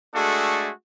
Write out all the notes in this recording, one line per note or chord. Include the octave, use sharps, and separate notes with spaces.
G#3 A3 D4 F#4 G#4 A4